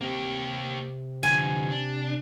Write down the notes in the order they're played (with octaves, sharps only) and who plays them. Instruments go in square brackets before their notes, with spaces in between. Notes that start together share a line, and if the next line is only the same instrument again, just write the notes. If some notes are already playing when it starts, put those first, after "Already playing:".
[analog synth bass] C3 [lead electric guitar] A#3 G4
[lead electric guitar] D3 F3 [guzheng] G#5
[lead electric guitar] D4